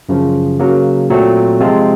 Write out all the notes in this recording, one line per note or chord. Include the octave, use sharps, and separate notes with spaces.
F#2 C#3 F3
C#3 F#3 A#3
A#2 F#3 A3 C4
C3 F3 G#3 C4 F4